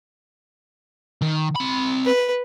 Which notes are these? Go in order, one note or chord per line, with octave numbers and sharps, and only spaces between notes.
D#3
C4 B5
B4